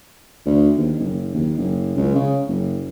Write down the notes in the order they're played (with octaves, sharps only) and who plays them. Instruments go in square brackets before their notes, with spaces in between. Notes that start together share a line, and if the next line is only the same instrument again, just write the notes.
[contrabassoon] D2
D#2
F#1
D#2
F#1
C#2
C#3
F#1